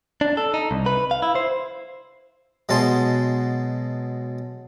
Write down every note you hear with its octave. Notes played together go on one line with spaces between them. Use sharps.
D4
A4
D#4
C2
B4
F5
E4
C5
B2 F#3 G#3 A5 C6